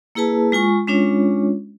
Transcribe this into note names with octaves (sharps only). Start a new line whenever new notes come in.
A#3 E4 G#4 B4 A5
G#3 F4 G#5 C#6
G#3 C#4 D4 F4 C#5